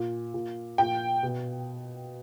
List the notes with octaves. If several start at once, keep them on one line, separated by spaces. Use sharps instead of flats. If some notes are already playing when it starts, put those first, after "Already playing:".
Already playing: A#2
A#2
A#2 G5
B2